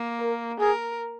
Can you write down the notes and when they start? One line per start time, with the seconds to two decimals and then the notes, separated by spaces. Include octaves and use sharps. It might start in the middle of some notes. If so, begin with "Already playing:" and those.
Already playing: A#3
0.21 A#4
0.60 G#4 A#4